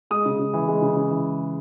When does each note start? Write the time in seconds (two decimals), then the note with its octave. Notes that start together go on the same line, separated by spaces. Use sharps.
0.11 G#3 D#6
0.26 C#3
0.39 C#3
0.54 E3
0.68 G#3
0.82 C#3
0.97 C#3
1.11 E3